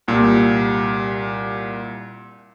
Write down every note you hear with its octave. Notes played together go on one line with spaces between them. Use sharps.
C2 A#2 G3